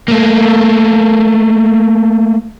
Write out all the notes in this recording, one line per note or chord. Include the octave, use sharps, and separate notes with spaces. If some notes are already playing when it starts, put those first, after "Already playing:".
A3 A#3